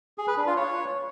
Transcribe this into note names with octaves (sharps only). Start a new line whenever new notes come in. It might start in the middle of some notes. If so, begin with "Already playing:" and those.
G#4
B4
D4
F4
C#5